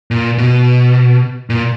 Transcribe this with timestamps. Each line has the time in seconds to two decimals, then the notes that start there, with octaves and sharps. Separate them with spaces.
0.11 A#2
0.38 B2
1.50 A#2